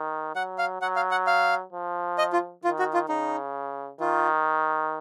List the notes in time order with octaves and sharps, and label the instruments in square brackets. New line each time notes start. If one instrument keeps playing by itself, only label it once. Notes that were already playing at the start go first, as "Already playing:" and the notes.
Already playing: [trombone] D#3
[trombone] F#3 [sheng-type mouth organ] F#5
[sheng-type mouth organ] F5
[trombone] F#3 [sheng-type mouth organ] F#5
[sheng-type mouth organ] F5
F#5
F5
[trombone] F3
[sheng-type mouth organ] D#5
F4
[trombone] D#3 [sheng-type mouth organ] F4
[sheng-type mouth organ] F#4
F4
[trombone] C#3 [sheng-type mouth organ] D#4
[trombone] D#3 [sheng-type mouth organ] F4